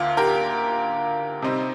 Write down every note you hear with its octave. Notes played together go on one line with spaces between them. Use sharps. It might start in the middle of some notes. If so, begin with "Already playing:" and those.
Already playing: D2 D3 A#3 F4
G4 A#4
C3 G3 C4 D#4